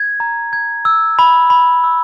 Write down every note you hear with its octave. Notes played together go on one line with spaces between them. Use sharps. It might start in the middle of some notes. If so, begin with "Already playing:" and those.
Already playing: G#6
A#5
G#6
E6
B5
B5
E6